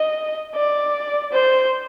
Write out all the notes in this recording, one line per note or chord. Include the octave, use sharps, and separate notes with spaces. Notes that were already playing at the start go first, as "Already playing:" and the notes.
Already playing: D#5
D5
C5